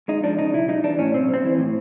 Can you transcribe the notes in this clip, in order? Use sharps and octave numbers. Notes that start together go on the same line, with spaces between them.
G#3 D#4
F3 D4
C#3 D#4
B1 E4
G3 D#4
E3 D4
A2 C#4
B1 C4
G3 C4
E3
A2